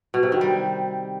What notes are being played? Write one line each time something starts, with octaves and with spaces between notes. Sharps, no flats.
B2
C3
D#3
G3